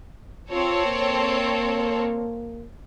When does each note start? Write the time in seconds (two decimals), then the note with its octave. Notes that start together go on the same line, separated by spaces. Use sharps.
0.51 C4 F4 A4 C#5
0.86 A#3